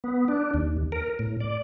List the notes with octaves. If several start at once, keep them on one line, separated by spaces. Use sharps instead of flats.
B3
D4
D#2
A#4
A2
D5